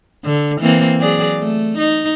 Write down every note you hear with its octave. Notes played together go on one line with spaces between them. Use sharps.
D3
E3 A#3 C4
F#3 G#4 D5
A3
D#4